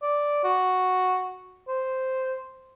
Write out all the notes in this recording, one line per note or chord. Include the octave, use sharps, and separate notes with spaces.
D5
F#4
C5